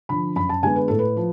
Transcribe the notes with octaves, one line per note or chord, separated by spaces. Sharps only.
D3 F3 B5
F#2 B5
A5
D3 G#3 B3 G#5
B4
A2 A4
B4
F3